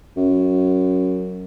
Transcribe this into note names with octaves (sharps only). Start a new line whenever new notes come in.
F#2